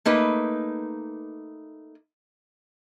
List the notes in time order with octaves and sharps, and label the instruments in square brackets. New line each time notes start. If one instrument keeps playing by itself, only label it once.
[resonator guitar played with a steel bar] A3 A#3 D#4 B4